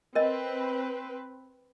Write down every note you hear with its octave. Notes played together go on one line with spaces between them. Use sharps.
C4 A#4 B4 D#5